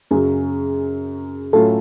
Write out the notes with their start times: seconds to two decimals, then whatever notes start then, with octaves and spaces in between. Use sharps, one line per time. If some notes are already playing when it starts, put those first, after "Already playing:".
0.11 F#2 C#3 F#3 G#4
1.53 A2 F#3 C#4 F4 A4